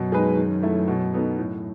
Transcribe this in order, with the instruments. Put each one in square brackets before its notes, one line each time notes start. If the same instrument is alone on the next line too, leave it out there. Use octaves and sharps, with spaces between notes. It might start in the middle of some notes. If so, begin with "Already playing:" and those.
Already playing: [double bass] F#2 [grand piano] B2
[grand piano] G#3 D#4 G#4 B4
D#3
A3 E4 A4
B2
F#3 B3 D#4 A4
A2